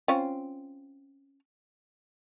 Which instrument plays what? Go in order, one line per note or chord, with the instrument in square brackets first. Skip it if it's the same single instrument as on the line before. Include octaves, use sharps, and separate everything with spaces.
[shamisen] C4 C#4 F4